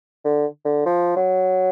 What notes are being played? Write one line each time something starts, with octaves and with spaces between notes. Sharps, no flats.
D3
D3
F3
F#3